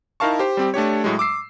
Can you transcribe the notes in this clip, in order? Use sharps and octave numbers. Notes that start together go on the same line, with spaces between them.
D#4 E4 A#4 F5 A5 C#6
G4 C5
G3 C4 G4
A3 D4 G4 C#5
A2 F#3 G#3
D6 E6 C7